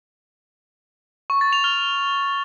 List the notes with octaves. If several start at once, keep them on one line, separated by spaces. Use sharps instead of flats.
C#6
A6
F7
F6